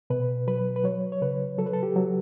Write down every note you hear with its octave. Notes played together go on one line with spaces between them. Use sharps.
B2 B4
F#3 B4
B4
F#3 C#5
C#5
C#3 B4
F#3 A4
B4
A4
G4
F#3